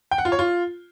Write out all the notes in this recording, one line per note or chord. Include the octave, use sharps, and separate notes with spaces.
G5
F#5
F4
C#5
F4